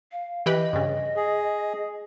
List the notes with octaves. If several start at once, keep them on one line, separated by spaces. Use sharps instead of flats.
F5
E3 G4 B4 D#5
G2 C#3
G#4